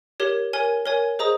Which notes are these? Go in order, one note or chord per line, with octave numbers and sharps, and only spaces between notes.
G4 A#4 C#5
A#4 C#5 G#5
A#4 C#5 G#5
G#4 C5 D#5 A#5 D#6